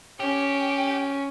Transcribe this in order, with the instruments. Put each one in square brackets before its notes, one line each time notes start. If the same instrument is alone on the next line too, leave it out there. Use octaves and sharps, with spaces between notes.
[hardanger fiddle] C#4 [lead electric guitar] G4